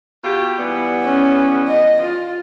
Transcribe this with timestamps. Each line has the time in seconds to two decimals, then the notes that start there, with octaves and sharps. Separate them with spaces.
0.24 B2 F4 G4
0.57 E3 G3 B3
1.03 C#4
1.68 D#5
2.01 F4